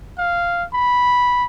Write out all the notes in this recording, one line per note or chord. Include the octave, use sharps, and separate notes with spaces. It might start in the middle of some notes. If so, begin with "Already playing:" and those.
F5
B5